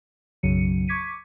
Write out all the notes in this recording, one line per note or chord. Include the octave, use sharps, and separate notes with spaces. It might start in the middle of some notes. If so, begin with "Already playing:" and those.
B1 F#2 C#3 F#3 C#7 D#7
C#6 D6 G#6 B6 C#7 D#7